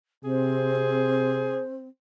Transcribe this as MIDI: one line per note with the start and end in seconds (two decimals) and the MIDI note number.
0.25 1.59 48
0.25 1.88 60
0.25 1.62 68
0.25 1.86 72